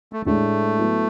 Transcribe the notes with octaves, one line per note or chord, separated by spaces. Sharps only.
A3
A2 G#3 A3 D4
F#3 B3 E4